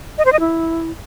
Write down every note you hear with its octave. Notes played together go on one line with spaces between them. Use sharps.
D#5
C5
D#5
E4